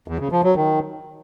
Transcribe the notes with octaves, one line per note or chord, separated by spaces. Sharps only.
E2
C#3
F3
F#3
D#3